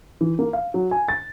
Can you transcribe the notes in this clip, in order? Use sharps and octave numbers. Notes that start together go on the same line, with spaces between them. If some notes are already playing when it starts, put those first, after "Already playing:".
E3
A#3
F5
F#3
G#5
A6